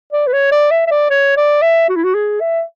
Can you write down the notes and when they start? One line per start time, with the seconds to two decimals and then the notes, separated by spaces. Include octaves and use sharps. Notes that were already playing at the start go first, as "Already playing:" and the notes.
0.13 D5
0.27 B4
0.33 C#5
0.52 D5
0.71 E5
0.87 E5
0.91 D5
1.10 C#5
1.37 D5
1.62 E5
1.89 F#4
1.96 E4
2.04 F#4
2.14 G#4
2.41 E5